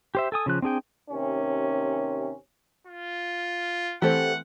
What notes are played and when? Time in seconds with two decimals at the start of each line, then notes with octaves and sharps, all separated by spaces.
0.15 G4 C5 E5
0.32 A4 G#5 D#6
0.46 C#3 F3 F#6
0.62 C4 D4 G#4 G5
1.10 D#2 C3 C#4
2.87 F4
4.02 E3 A3 C4 G4 A4 C5 F#5